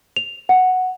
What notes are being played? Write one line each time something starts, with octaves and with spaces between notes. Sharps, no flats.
F7
F#5